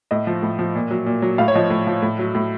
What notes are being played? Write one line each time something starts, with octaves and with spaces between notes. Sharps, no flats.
A2 D#5
F3
A2
F3
A#2
F#3
A#2
F#3
A2 F5
C#5
F3 D#5
A2
F3
A2
F#3
A2